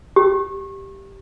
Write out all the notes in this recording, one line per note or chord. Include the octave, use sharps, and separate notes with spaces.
G4